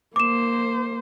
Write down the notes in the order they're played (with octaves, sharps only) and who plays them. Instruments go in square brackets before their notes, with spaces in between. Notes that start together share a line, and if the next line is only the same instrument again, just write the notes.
[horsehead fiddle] A#3 C5 [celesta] D6 E7